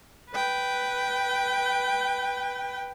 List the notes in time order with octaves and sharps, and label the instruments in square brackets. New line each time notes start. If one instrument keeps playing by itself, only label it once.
[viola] B4 G5